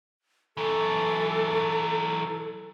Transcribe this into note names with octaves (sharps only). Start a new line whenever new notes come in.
E3 F#3 A4